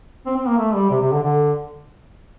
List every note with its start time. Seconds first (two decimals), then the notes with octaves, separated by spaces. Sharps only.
0.26 C4
0.37 C4
0.47 A#3
0.58 A3
0.74 G3
0.90 C3
1.01 C3
1.12 D3
1.23 D3